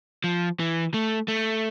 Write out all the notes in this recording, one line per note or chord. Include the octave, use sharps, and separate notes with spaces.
F3
E3
A3
A3